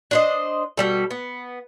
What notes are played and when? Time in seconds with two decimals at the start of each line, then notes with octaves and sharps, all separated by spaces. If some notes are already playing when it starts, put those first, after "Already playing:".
0.11 D4 C5 D#5
0.77 B2 G3 A4
1.10 B3